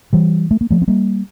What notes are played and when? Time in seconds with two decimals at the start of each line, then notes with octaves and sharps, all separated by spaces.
0.13 E3 G3
0.51 A3
0.61 A#3
0.71 F3 A3
0.82 C4
0.88 G3 A#3